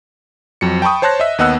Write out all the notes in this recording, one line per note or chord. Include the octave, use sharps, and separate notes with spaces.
F2 F#3 C#7
G5 A5 B5 C#6 D#6
C5 C#5 A5 C6 F#6 A#6
D#5 E5
D#2 B3 D#5 F#5 E6 F#6